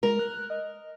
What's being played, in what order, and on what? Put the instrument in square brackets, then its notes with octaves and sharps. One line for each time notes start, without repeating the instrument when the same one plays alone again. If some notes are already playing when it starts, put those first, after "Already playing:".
[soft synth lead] G#3 [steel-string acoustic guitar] A#4
[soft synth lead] F#6
D#5